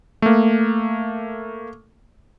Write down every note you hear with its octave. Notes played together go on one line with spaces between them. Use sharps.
A3 A#3